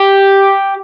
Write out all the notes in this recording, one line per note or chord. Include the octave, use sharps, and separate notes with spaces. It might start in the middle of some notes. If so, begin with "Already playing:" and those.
Already playing: G4